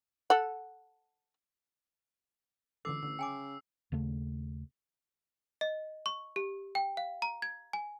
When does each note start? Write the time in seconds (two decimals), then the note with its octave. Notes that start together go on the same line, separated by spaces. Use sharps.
0.30 A4 F#5
2.85 C#2 D3 E3 A4 D6 E6 C7
3.03 A1 D3 E6
3.19 C#3 G5 G#5 D6
3.92 D#2 C#3 A3
5.61 D#5
6.06 C#6
6.36 G4
6.75 G5
6.97 F5
7.22 A#5
7.42 G#6
7.73 G#5